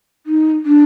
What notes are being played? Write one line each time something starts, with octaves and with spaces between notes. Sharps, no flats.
D#4
D4